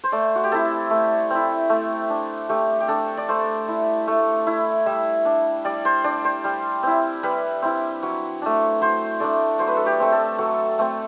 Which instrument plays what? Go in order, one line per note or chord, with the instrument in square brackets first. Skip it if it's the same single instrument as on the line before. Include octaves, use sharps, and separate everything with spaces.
[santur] C5
A3 D5
F#4
G4
C4 E4 A4
A3
C4 E4
A3
D4
A3 G4
G4
D4 A4
D5
A3 C5
E4
A3
E4
G3 E5
D4
G3 D5
C5
D4 D5
C5
G3
C4 E4
G3 B4
C4 E4
F#3
A3 D4
F#3 C5
A3 D4 D5
F#3 C5
B4
A4
G4
A3 C4
A4
F#3 A4
A3 C4